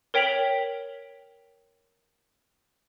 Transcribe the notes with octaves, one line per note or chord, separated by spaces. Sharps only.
A#4 C#5 G5 B6 F7 F#7